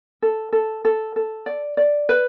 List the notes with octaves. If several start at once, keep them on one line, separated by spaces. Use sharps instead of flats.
A4
A4
A4
A4
D5
D5
B4